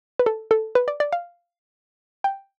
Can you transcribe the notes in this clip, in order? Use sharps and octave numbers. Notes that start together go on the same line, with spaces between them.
B4
A4
A4
B4
D5
D5
F5
G5